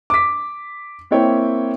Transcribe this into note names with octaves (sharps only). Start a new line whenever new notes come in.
D6 B6
A#3 C4 E4 C#5 G5